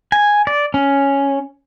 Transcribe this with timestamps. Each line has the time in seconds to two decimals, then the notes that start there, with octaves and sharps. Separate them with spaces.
0.12 G#5
0.47 D5
0.74 C#4